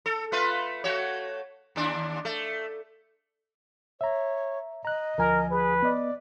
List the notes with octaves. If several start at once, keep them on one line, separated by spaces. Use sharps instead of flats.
A4
A3 F4 B4
A3 F#4 C#5
D#2 D4
A3
C#5 E5 A#5
D#5 A#5 F#6
D2 F3 A#4 G#5
G#4 B4
B3 D5 D#5